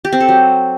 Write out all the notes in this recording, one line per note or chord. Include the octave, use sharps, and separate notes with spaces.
G4
C4
A4
F#3